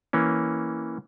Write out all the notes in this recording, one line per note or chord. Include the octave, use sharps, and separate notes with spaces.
E3 A#3 C#4